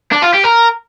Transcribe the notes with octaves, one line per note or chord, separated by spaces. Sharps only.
D4
F4
G4
A#4